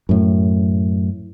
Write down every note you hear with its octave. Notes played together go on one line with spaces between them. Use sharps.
F#2 A2